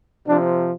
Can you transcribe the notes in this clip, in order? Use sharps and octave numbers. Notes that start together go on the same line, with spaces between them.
C3 F3 D4